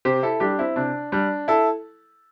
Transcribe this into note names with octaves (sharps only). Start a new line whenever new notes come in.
C3 G4 C5
E4 A4
G3 D4 G4
C4 E4
C3 D4
G3 D4
E4 A4